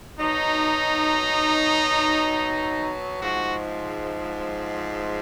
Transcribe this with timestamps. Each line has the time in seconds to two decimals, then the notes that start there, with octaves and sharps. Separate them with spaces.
0.19 B2 F#3 D#4
3.21 G#2 F3 G#3 F#4